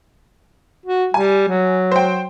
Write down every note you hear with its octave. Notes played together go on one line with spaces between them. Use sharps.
F#4
G3 G#5
F#3
C5 G5